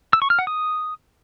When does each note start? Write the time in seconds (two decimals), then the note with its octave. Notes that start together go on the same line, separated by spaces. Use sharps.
0.13 E6
0.22 C#6
0.30 F6
0.39 F#5
0.47 D#6